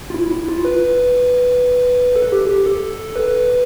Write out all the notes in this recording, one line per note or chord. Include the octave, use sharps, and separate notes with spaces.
F4
E4
E4
F4
B4
A4
G4
G4
A4
B4